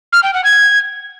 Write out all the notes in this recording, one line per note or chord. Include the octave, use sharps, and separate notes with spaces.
F6
G5
F#5
G#6